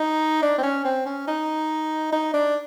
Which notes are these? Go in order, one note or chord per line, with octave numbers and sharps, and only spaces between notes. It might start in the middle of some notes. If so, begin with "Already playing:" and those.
Already playing: D#4
D4
C4
C#4
C4
C#4
D#4
D#4
D4